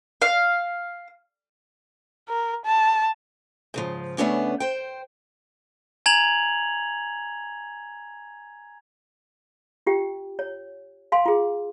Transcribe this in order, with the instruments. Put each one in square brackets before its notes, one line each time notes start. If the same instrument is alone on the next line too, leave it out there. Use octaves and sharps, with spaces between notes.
[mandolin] F5
[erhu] A#4
A5
[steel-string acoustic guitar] G#2 C#3 F3
C#3 A3 B3 C#4 D4
C5 G5
[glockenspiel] G#5 A#5 G#6 F7 F#7
[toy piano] F4 G4 G5
C#5
F5 G#5 C6
F4 G#4